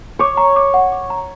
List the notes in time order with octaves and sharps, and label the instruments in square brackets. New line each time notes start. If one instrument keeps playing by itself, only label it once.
[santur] C#5 [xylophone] D6
[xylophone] A#5
D6
F#5
D6
A#5